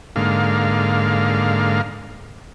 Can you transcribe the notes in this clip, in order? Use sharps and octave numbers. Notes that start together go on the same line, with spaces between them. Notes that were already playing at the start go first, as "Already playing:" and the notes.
G#2 D3 A#3 F5